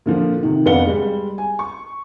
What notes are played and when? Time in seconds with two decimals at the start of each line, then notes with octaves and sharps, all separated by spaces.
0.06 A#2 D3 F3
0.43 C3 D#3
0.66 F2 B3 D4 F5 F#5 G7
0.86 G3 G#3
1.38 G#5
1.59 C#6